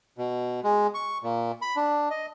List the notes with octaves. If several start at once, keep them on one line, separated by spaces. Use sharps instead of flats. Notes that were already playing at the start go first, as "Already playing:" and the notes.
B2
G#3
C#6
A#2
B5
D4
D#5